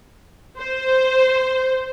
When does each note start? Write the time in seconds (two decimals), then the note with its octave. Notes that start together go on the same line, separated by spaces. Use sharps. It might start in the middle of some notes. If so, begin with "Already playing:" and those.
0.58 C5